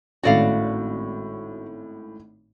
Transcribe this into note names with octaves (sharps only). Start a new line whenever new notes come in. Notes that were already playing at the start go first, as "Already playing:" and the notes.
G#1 A2 C#4 F#4 D5 F5